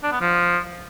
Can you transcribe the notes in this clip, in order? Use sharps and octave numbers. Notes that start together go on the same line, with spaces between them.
D4
B3
F3